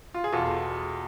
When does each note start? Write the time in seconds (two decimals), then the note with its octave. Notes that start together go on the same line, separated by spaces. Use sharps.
0.14 F4
0.24 G#4
0.32 E2 B2 F4 A4